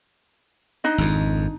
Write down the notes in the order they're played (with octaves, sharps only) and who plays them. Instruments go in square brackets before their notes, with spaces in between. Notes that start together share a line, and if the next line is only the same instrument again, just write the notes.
[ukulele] D4 D#4 D#5
[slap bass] G#1 F2